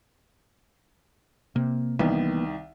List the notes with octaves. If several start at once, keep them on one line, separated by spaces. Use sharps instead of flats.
C3 A#3
C2 D#3 E3 A#3 B3